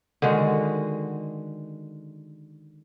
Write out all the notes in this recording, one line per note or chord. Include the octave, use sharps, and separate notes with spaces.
D3 D#3 G#3 F#4